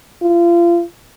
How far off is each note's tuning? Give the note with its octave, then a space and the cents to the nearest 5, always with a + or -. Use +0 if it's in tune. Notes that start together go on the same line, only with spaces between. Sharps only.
F4 -30